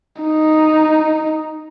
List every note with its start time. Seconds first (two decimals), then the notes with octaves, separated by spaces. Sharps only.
0.22 D#4